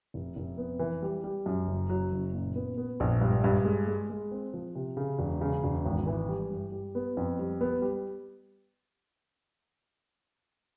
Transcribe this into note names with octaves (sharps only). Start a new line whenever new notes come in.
F1
F1
B3
E3
G3
G3
F#2
F#1
F#3
F#1
A#2
B3
B3
A#1
G2
G2
G#3
G#3
G#3
C4
F3
C3
C#3
E1
C#3
E1
G#1
E3
G3
G2
G3
B3
F2
G3
B3
G3